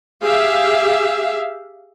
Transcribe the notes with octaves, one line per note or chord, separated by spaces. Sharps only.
G4 G#4 E5 F5